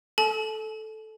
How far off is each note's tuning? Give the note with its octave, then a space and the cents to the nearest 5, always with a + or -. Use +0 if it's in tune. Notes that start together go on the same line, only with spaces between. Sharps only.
A4 -10 A5 -40